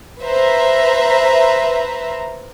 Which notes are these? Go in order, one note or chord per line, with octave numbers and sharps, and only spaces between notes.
B4 C5 E5 A#5